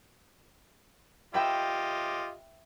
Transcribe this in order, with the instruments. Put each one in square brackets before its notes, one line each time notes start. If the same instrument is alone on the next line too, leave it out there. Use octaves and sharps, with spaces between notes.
[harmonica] F4 G4 D#5 [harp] E5 G5 B5